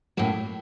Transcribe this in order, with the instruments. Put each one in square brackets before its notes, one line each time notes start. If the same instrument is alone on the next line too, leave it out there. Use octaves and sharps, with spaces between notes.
[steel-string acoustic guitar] A2 F#3 A#3 C#4